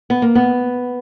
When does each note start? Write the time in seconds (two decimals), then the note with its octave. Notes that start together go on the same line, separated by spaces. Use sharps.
0.10 B3
0.22 A#3
0.35 B3